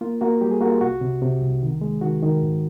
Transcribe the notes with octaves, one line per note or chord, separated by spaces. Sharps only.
A#3 F4
A#3 F#4
G3 G4
G#4
A#3 F#4
F4
C2 F#4
C3
C3
C2
D#3
G#3
D#3 F#4
D#3
G#2